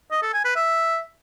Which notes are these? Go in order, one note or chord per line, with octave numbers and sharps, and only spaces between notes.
D#5
A4
G#5
B4
E5